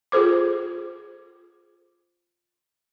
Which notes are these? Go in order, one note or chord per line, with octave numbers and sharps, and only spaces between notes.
F4 G#4 A4 C5 D6